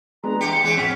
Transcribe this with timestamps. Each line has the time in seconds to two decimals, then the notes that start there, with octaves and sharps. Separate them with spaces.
0.24 G#3 B3 D4 A#5
0.41 E2 G4 C#7
0.64 E3 C4 G#4
0.77 A1 F2 C#4 F#5 B6